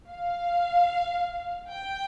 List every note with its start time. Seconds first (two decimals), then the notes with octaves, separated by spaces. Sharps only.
0.10 F5
1.72 G5